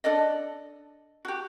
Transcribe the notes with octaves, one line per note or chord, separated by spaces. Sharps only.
D4 A4 D5 D#5
F#4 G4